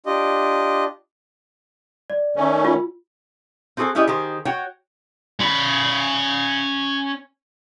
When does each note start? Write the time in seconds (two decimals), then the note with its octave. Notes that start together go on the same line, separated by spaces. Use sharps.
0.06 D4 F4 G4 D#5
2.10 D5
2.36 D#3 A3 C#4
2.65 F4
3.77 C4 F#4 G#4 A4 C5 G#5
3.95 C#4 E4 G4 G#4 D5 D#5
4.08 D#3 G4 G#4 C5
4.45 F#4 C#5 F#5 G5
5.40 C#4 B5